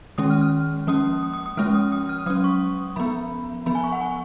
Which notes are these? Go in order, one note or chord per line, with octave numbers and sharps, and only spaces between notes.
D#3 G#3 C#4 D#6
F6
F6
F3 A#3 C#4 D#6
D#6
D#6
D#6
F3 G#3 C#4 F6
D#6
D#6
F6
F#3 C#4 D#6
C#6
F3 B3 B5
F3 B3 B5
G#5
C#6
F#5
G#5